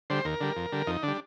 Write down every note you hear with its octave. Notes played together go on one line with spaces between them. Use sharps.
D3 G3 C5
D#2 A#4
D3 G3
F2
D3 G3
F2 D#4
D3 G3 D4